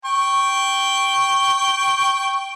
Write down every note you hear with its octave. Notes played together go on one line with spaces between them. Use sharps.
G5 C#6